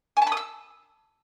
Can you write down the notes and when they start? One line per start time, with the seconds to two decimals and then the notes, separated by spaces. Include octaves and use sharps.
0.17 G#5
0.22 A5
0.27 B5
0.32 D#6
0.37 E6